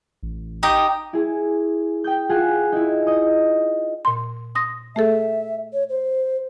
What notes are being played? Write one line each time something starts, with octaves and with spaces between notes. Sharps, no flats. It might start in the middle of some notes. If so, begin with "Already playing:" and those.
A1
D#4 G4 D#6
E4 G#4
G5 D#6 G6
F4 G#4 F#5 G#5
D#4 E4
D#5 D#6
A#2 C6
C6 D#6 A#6
A3 G#4 A4 E5
C#5
C5